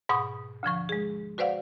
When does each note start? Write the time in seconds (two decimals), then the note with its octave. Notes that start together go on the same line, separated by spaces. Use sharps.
0.09 G#2 B2 F#5 B5 C#6 D#6
0.63 D2 D3 F3 C#6
0.89 G#3 G#4
1.38 F#4 B4 C5 D5 F5 F#5